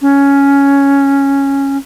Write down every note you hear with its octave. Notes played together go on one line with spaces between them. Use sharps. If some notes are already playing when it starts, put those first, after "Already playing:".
C#4